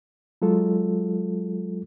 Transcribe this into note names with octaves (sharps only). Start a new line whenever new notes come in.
F#3 G#3 F4 A4